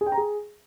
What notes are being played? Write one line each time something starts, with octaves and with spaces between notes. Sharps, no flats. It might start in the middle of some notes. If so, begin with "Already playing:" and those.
G#4
G5
A#5
G#4